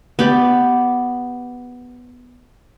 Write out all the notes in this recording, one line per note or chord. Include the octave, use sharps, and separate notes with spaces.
B3 G4 D5